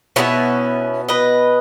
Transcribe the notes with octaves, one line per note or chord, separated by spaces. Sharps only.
B2 G#3 B3 C#4 E4
B4 D#5